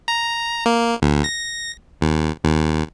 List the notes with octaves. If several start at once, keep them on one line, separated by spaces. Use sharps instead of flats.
A#5
A#3
D2
A#6
D#2
D#2